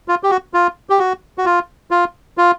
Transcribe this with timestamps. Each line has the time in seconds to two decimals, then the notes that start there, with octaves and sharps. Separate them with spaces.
0.08 F4
0.23 G4
0.30 F#4
0.54 F4
0.90 G4
0.99 F#4
1.38 F#4
1.46 F4
1.91 F4
2.38 F4